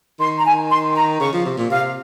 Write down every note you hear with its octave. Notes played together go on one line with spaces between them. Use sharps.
D#3 C6
A#5
G#5
C6
A#5
C#3 C#6
F3
C3
A#2
C3 F5